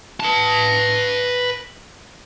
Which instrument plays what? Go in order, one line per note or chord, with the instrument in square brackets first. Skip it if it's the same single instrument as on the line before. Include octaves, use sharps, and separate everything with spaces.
[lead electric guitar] B4 A5